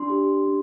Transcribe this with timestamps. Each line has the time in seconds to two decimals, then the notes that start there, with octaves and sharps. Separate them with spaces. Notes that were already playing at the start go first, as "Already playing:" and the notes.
Already playing: D4 C6
0.10 G4
0.45 D4